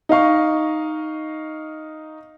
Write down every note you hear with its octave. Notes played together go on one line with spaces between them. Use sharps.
D#4 D#5 F5 C#6